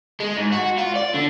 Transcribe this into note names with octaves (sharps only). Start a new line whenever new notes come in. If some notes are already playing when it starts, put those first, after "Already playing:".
G#3
G#2
F#4
F4
D5
D3